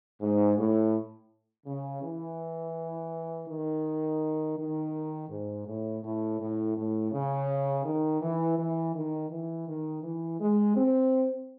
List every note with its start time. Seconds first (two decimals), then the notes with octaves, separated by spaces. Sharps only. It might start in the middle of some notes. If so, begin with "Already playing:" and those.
0.21 G#2
0.58 A2
1.66 C#3
2.03 E3
3.48 D#3
4.57 D#3
5.30 G#2
5.66 A2
6.03 A2
6.40 A2
6.76 A2
7.12 C#3
7.85 D#3
8.22 E3
8.58 E3
8.95 D#3
9.31 E3
9.67 D#3
10.03 E3
10.40 G#3
10.76 C4